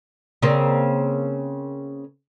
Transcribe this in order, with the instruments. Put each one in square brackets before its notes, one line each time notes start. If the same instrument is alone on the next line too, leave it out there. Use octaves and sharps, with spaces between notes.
[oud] C#3 A#3 C4